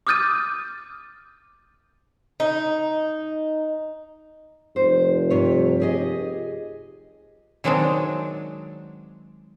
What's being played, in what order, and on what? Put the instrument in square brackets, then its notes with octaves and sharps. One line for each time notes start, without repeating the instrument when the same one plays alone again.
[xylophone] D6 D#6 F6 G6 A6 D#7
[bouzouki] D#4
[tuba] F1 [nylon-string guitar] C5
[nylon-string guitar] G2 C3 C#5
G4 G#4 D#5
[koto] D#3 F#3 G#3 C4 D4